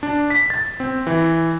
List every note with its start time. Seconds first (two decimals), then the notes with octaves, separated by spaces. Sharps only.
0.03 D4
0.30 B6
0.50 A6
0.80 C4
1.07 E3